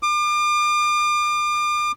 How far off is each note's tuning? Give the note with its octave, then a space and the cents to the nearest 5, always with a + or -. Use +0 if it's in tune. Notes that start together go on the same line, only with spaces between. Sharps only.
D6 +40